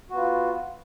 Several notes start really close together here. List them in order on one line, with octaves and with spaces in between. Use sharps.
F#4 B3 F4